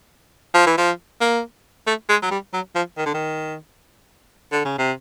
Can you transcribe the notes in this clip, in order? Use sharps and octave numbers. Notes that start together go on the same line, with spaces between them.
F3
E3
F3
A#3
A3
G#3
F#3
G3
F#3
F3
D#3
D3
D#3
D3
C#3
C3